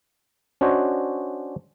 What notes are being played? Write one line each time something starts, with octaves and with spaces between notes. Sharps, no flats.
C#4 D4 F#4 C5 D#5 G#5